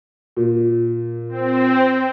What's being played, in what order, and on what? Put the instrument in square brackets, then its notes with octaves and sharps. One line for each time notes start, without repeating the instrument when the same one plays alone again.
[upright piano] A#2
[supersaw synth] C4